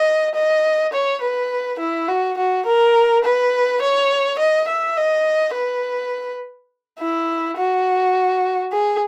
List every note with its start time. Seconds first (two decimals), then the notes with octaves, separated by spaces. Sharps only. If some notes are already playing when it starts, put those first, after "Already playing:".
Already playing: D#5
0.35 D#5
0.93 C#5
1.21 B4
1.79 E4
2.08 F#4
2.38 F#4
2.66 A#4
3.24 B4
3.81 C#5
4.38 D#5
4.68 E5
4.97 D#5
5.54 B4
6.99 E4
7.57 F#4
8.72 G#4